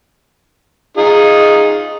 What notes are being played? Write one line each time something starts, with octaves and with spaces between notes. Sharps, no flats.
D#4 F4 G#4